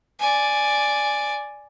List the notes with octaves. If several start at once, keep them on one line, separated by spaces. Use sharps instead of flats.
D5 G#5